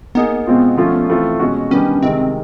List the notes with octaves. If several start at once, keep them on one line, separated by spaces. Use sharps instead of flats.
A#3 B3 D#4 G#4
B2 G#3 C4 F4
F3 A3 C#4 F4
E3 A3 C4 F4
B2 G#3 C#4 F#4
D#3 G3 B3 C#4 D4 G4
C3 D#3 G#3 C4